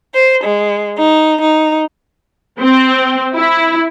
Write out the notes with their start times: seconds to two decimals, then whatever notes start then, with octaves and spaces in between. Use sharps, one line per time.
0.15 C5
0.44 G#3
0.98 D#4
1.42 D#4
2.60 C4
3.35 E4